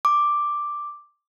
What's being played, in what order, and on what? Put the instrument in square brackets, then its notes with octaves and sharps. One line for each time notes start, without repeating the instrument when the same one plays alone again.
[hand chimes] D6